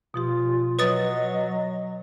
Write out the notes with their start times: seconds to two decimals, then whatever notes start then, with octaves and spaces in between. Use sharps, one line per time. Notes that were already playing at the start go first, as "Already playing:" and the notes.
0.14 B2 F3 F4 G4
0.79 F#3 B4 C#5 D#5 D#6 A6